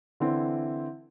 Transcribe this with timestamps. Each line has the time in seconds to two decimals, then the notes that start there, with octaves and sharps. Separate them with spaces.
0.20 D3 E3 C4 E4